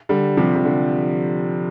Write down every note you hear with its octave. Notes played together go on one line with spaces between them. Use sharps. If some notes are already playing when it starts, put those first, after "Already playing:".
D3 G3
C3 F3
C3
D3